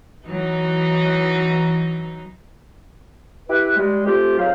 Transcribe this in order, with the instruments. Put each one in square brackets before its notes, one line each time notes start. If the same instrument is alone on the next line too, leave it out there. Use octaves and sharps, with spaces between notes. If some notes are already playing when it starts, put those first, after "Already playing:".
[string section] E3 F#3 D#4
[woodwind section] E4 G4 B4
G3 G#3
A3 C4 F4 G4
F2 G#2 F#3 C5 F5